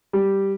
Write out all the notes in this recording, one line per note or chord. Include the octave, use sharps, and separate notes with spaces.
G3